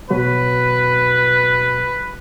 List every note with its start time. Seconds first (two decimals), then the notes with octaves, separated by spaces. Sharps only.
0.10 B2 F#3 F#4 B4